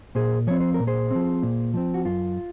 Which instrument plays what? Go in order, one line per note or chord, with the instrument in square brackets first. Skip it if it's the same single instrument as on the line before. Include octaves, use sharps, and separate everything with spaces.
[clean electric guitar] A#2 G#4 C5
F3 C4 C#5
C5
A#2 A#4
G#4 C5
F3 C4
A#2
F3 C4
F#4
F#2 F4